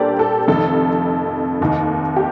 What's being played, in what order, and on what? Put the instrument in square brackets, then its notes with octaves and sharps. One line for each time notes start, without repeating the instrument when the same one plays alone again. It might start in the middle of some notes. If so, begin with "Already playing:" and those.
Already playing: [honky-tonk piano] A#2 G3 D4 G4 A4 A#4 C5 D5
A4
F1 F2 D#3 A4
F1 D#2 D#3
G4